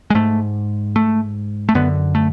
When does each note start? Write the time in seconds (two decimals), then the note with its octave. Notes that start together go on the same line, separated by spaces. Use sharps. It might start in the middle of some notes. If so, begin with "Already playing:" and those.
0.10 G#3
0.15 G#2 A3
0.96 A3
1.69 A3
1.75 F#2 D3 B3
2.15 A3